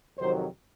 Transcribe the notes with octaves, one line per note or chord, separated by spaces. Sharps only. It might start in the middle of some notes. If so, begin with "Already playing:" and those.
F2 C3 D#3 F#3 C5